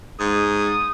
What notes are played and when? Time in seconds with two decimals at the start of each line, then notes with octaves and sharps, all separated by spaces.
0.20 G#2 D#6